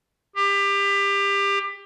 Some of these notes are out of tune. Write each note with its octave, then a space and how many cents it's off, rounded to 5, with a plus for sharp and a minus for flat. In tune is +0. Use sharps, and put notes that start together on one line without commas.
G4 +25